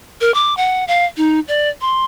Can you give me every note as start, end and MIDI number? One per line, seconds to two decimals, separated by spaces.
0.21 0.34 70
0.34 0.55 86
0.57 0.84 78
0.88 1.06 77
1.17 1.40 63
1.48 1.69 74
1.81 2.05 84